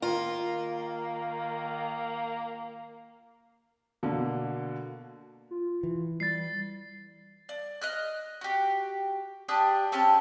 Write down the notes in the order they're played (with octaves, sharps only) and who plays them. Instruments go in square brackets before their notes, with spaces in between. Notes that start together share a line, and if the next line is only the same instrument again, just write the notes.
[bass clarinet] D#3 [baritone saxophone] A#3 [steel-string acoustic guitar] F4
[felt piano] B2 D3 A#3
[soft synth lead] F4
[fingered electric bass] E3
[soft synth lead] G3 [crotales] A6 C7
[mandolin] D5
D#5 F6 F#6
F#4 G4
D4 G4 D#6
C4 C#4 G4 A5